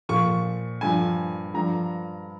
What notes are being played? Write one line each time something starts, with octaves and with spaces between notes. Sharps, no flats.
A#2 F3 C#6
G2 F3 G#5
G2 F3 A#5